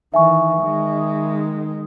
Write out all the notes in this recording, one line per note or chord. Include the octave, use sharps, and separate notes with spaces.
D#3 E3 E5 G#5 C#6
D#3 G#3